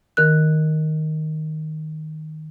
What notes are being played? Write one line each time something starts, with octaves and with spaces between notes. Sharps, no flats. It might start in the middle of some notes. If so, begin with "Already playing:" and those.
D#3 A#4 F#6